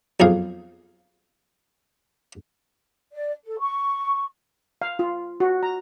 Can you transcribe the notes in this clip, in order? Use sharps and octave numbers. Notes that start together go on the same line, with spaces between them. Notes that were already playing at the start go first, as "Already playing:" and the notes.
B1 F2 G#4 F5
D5
A4
C#6
F5
F4
F#4
A#5